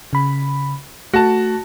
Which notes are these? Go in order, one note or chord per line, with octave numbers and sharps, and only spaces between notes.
C#3 B5
A3 F#4 A5